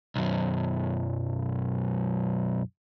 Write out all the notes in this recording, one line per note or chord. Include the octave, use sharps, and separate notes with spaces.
B1 F#2